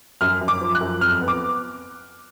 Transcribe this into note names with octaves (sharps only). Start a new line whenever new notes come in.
F#2 F6
F#2
D6
F3
F#6
F#2
F2 F6
B3
D6